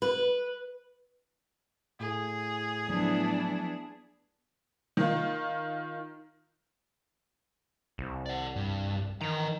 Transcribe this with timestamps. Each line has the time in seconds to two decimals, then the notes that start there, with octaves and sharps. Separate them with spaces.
0.02 B4
2.00 A2 G#4
2.88 F3 F#3 A3 B3 D4 E4
4.97 D#3 F4
7.98 C2
8.26 D5 F#5
8.56 G2
9.21 D#3 E3 A#5